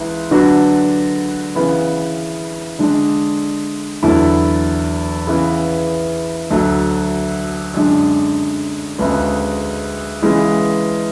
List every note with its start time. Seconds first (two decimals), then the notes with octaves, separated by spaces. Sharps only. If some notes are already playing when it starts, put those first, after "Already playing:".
Already playing: C#2 E3
0.31 D3 F#3 B3 D4 F#4
1.55 C#3 E3 B3
2.79 D3 G#3 D4
4.03 E2 D3 F#3 A3 E4
5.27 C#3 E3 B3
6.50 D2 D3 F#3 A3
7.74 F#2 D3 G#3 D4
8.98 D2 C#3 G#3 B3
10.22 C#3 E3 G#3 B3